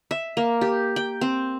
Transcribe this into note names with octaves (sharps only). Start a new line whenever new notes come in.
E5
A#3
G4
G5
C4